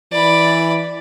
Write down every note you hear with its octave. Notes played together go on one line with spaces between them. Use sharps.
E3 D5 B5